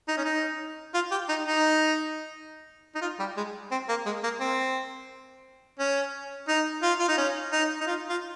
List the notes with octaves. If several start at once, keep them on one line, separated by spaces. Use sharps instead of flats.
D#4
C#4
D#4
F4
G4
D#4
D#4
D#4
F4
G3
G#3
C4
A#3
G#3
A#3
C4
C#4
D#4
F4
F4
D#4
C#4
D#4
D#4
F4
F4